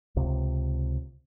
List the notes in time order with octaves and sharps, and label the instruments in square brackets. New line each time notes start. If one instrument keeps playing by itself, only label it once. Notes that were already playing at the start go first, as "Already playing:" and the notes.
[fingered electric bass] C#2 C3